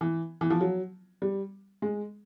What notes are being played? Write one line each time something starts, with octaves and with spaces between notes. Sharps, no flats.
E3
E3
F3
F#3
G3
G#3